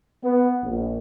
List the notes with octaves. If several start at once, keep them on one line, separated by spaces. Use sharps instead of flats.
B3
A#1